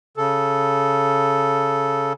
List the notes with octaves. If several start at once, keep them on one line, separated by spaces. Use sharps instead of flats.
C#3 A4